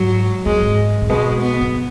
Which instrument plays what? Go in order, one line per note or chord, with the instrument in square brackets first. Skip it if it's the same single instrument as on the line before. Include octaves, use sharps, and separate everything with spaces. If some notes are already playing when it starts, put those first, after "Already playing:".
Already playing: [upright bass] G#2 [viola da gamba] F#3
[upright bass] F#2 [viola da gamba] G#3
[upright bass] G#2
G#2
[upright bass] B2 [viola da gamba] G#3
[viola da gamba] B3
[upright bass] F#2